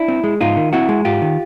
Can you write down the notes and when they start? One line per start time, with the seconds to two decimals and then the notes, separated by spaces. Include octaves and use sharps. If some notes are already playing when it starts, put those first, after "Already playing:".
Already playing: D4 E4
0.08 C4
0.24 G#3
0.41 G#2 D#4 F4
0.57 D#3
0.73 C4 E4 F#4
0.89 G#3
1.05 G#2 F4 G4
1.22 D#3